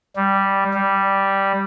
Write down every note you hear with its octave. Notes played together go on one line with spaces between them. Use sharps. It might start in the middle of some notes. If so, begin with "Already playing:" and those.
G3
G3